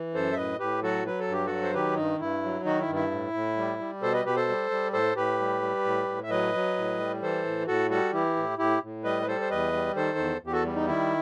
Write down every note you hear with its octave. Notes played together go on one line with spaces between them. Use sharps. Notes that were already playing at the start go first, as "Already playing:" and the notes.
Already playing: E3
F#2 A4 C5
E5
A2 B4 D#5
A2 G4 B4
F#3 F#4 A4
F#3 B4
A4
G2 G4
F#3 F#4 A4
C5
D#3 G4 B4
G2 D#4
G2 E4
F#3
D#3 D#4 F#4
E4
G2
E4
A2
A2
G3
G3
B2 A4 C5
B4 D#5
B2 G4 B4
A4 C5
G3
G3
A2 A4 C5
A2 G4 B4
G3
G3
A2
A2
E5
F#3 B4 D#5
F#3
A2
G3
E3 A4 C5
A2
A2 F#4 A4
G3 F#4 A4
E3 E4 G4
A2
A2 E4 G4
A2
G3 B4 D#5
B4
G3 A4 C5
C5
E2 B4 D#5
G3
D#3 A4 C5
E2
E2
G4
F#4 A4
G3
D#4
D#3 E4